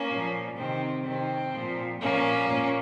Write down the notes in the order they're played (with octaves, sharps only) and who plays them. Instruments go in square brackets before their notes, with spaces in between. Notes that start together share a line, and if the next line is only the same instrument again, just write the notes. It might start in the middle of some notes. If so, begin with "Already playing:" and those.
Already playing: [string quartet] A#3 C#4
A#2 F3
C3 D#3 C4
C3 D#3 C4
A#2 F3
A#2 F3 A#3 C#4
A#2